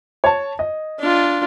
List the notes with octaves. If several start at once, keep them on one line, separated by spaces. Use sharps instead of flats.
C#5 A5
D#5
D4 F4